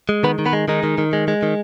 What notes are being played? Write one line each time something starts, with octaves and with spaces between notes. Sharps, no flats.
G#3
D#3 B3 B4
D#3
B3 B4
G#3
D#3 G#3 D#4
D#3
D#3
G#3
G#3
D#3